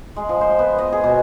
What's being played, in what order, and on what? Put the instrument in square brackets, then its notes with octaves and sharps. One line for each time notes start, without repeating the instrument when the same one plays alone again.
[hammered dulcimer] G#3
F3
C5
B3
D#5
G#4
B2